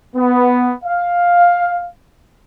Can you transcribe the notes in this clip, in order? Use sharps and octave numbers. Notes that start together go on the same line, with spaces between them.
B3
F5